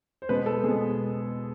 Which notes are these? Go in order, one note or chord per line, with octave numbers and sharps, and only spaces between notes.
C5
B2 G#3 B3 B4
A4
B2 G#3 B3 G#4